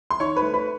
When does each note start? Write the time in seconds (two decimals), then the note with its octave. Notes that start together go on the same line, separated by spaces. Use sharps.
0.10 C6
0.20 D#3 C#5 C#6
0.36 B4 B5
0.42 A3
0.53 B4 B5